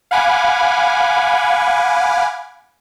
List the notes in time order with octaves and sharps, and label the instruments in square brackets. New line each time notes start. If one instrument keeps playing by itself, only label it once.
[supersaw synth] F5 F#5 G#5 B5 D6